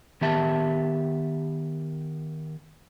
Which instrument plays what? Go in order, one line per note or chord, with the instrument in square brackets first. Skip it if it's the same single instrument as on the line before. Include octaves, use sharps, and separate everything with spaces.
[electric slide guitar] D#3 B3 G4 E5 A5